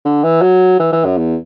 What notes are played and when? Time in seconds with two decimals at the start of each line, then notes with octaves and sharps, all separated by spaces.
0.05 D3
0.23 E3
0.42 F#3
0.80 E3
0.92 E3
1.05 F#2
1.17 E2